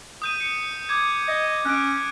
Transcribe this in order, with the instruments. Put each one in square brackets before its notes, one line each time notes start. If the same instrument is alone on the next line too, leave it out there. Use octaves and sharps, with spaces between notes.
[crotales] D#6 G6 D#7
C#7
D6 G#6
[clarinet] D#5
[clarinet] C#4 [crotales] F#6 D7